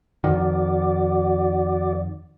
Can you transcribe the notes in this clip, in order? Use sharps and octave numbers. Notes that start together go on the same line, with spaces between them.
F2 D#3 F#4 D5